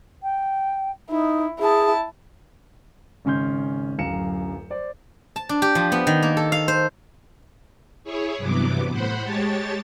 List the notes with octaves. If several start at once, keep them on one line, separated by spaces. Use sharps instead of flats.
G5
D#4 E4
E4 G#4 A5
G#1 C#3 C#4 C6 G6
D1 F#2 F5 A#5 C#7 E7
C5 D5
A5
D4
G4
F3
B3
D#3
A#3
A4
F5
C5
E4 G#4 C#5
G2 C3 E3 F#3 B3 D6
A2 C5 F#5 B5
G#3 G4 C#5 A5 A6